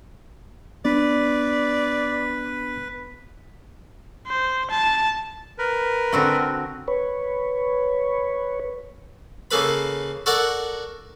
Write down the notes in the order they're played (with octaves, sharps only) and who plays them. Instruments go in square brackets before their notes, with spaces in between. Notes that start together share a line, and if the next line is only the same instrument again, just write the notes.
[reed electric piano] B3 D4 [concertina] B4 [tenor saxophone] D5
[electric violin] C5
A5
[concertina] A#4 B4
[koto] D3 C4 F#4
[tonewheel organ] B4 C#5
[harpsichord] C#3 A#3 A4 B4 B5
F#4 A4 A#4 D5 F#5